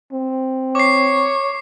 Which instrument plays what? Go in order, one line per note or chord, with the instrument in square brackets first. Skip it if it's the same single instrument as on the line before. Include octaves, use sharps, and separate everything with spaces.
[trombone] C4
[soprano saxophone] C#5 [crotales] D6 C7